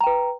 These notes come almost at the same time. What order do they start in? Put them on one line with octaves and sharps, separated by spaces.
A#5 G5 B4